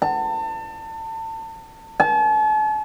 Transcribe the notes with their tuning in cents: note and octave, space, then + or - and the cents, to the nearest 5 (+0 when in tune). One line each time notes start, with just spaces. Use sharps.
A5 +30
A5 -45